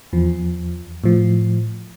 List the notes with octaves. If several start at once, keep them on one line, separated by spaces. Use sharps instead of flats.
E2 F3
A2 F3